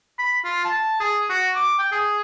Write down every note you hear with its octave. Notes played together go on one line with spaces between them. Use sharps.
B5
F4
A5
G#4
F#4
D6
G5
G#4